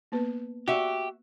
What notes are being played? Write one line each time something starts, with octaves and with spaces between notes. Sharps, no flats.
A#3 B3 B4
F#4 G4 E5